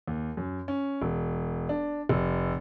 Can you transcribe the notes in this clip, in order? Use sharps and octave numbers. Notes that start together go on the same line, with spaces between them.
D#2
F#2
C#4
E1
D4
F1